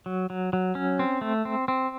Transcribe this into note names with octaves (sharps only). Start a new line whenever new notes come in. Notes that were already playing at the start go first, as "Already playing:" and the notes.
F#3
F#3
F#3
C#4
C4
A3
C4
C4